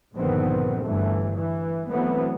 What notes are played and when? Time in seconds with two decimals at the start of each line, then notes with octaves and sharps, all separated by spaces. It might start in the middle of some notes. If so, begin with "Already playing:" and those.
0.16 A#1 G2 D3 D#3 B3 C4
0.84 G1 G2 E3 A3
1.37 E3
1.90 E3 F#3 A3 B3 C4